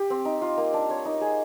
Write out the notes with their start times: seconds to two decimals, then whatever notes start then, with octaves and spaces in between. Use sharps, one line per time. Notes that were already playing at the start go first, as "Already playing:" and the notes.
Already playing: G4
0.10 C4
0.25 D#4
0.41 F4
0.57 A#3
0.74 D4
0.90 C#5
1.05 D#4
1.21 G#4